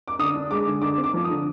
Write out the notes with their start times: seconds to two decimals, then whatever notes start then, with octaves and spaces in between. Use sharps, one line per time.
0.08 D6
0.19 D3 D#6
0.35 D4
0.51 G#3 D6
0.67 D3
0.82 D3 D6
0.98 C4
1.04 D6
1.14 F3
1.24 D#6
1.30 D3